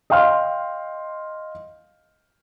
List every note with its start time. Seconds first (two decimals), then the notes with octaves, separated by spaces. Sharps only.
0.10 D#5 F5 G5 C6 F6